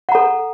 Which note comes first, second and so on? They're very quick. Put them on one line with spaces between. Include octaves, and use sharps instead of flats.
F#5 A#5 A4